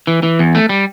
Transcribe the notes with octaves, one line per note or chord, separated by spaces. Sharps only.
E3
E3
E2
A3
G3